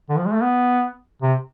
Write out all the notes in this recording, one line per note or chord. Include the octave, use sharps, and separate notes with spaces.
D3
F3
G#3
A3
B3
C3